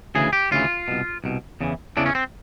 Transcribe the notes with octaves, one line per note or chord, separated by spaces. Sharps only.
D2 C#3 E3 G#4
G4
D2 C#3 E3 F4
C2 B2
C2 B2
E2 C#3 E3
E2 C#3 E3 D4
C#4
C4